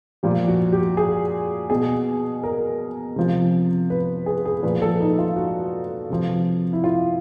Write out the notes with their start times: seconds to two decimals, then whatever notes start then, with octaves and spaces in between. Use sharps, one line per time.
0.23 A#2 F3 G4
0.48 F#4
0.72 G4
0.97 G#4
1.70 B2 G#4
2.43 A#4
3.16 C3 F3
3.90 B4
4.26 G#4
4.46 G#4
4.63 A#2 F3 B4
4.82 A4
5.01 D#4
5.19 F4
5.36 F#4
6.10 C3 F3
6.73 E4
6.84 F4